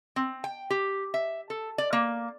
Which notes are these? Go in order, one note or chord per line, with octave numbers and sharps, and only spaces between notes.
C4
G5
G4
E5
A4
D5
A#3